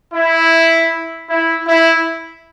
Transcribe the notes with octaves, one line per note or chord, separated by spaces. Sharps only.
E4
E4
E4